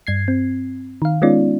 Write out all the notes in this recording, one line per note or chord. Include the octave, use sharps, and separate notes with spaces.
G2 G#6 C7
C4
D#3 F5
G#3 B3 C#4 D#4 F4 D5